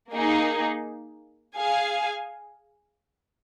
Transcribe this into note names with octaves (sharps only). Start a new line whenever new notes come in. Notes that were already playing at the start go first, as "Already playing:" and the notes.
A#3 D#4 G#4
G#4 F5 G#5